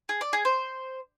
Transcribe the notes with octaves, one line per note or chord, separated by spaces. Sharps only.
G#4
D5
G#4
C5